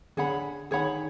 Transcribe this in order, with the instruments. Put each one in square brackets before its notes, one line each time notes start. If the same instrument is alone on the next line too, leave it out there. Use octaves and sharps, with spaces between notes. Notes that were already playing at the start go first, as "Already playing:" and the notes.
[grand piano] D3 [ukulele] G#4 C#5 F#5 B5
[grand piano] D#3 [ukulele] G#4 C#5 F#5 B5